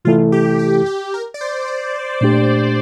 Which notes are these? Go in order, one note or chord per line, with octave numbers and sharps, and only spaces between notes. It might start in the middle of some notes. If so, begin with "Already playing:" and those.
C3 E3 A3 E4 F4 A4
G4
G4
G4
A#4
D5
C5
C5
A#2 A3 D4 G4